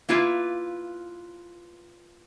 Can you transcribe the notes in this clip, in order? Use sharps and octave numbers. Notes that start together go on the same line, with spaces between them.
A#3 E4 F4 B4